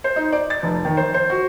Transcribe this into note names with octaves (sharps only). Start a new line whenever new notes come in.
C5
D#4
D5
A6
F1
D#3
C5
C5
F#4